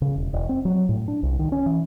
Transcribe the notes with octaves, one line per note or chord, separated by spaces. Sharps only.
C#3
E1
E1
C4
F#3
A2
D4
C2
D#3
C#4
E3